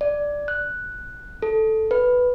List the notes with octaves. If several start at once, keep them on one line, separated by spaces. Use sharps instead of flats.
D5
F#6
A4
B4